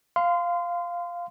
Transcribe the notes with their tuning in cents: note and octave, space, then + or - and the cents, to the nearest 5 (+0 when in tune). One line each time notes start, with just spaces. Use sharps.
F5 +0 C6 -25